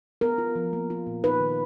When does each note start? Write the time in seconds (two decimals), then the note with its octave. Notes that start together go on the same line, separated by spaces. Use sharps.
0.21 B3 A#4
0.38 F4
0.56 F3
0.73 A#3
0.90 F4
1.07 A#2
1.24 D#4 B4
1.41 D#3